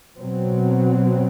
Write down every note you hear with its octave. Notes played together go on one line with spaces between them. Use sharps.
B2 F#3 C4